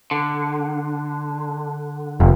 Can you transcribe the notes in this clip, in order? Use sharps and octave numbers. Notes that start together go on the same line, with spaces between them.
D3
F1